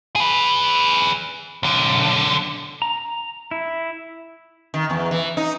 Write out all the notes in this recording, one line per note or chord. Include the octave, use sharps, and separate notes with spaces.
G#4 B4
B1 D3
A#5
E4
D#3
E2
E3
D#4